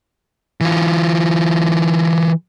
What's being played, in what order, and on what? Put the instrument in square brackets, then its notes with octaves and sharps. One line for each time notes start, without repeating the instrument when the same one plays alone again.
[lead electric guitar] E3 F4